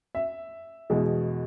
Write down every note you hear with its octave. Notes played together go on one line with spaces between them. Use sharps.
E5
E2 B2 G#3